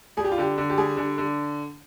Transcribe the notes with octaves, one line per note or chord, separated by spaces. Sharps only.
G3 G#4
G4
F4
D3 G4
D3
G4
G3 G#4
D3
D3